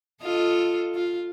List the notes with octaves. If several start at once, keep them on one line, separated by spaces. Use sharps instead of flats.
F4 A4 D#5
F4